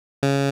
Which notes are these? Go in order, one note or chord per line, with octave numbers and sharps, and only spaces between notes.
C#3